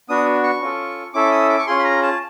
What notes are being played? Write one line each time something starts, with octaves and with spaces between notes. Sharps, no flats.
B3 D4 F#4 D#6
C#6
C#4 F4 A4
C#4 E4 A4 D6
D#6
D6
C#6
C#4 F4 G#4 C6
B5
A#5
A5